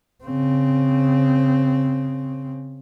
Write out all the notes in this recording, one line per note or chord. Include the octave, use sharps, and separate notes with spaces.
C#3 C4